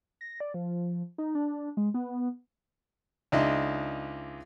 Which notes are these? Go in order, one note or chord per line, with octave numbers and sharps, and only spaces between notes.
A#6
D5
F3
D#4
D4
G#3
B3
C#2 D4 D#4 D#5 E5 C6